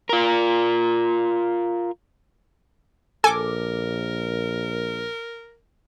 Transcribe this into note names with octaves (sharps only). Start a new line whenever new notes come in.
F4 A#4
A#1 A4 A#4 G#5 D6